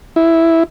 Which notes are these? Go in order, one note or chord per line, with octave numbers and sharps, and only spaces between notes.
E4